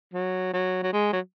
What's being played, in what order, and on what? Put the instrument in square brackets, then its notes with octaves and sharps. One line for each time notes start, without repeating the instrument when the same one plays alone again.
[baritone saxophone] F#3
F#3
F#3
G#3
F#3